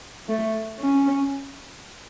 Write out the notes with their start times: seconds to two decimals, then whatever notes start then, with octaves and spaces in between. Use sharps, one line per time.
0.28 A3
0.80 C#4